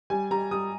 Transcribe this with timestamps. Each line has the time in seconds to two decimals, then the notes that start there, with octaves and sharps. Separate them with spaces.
0.10 G3 G#5
0.31 G3 A#5
0.51 G3 D#6